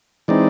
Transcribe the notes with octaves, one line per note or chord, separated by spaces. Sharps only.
E3 G#3 C4 D#4 D5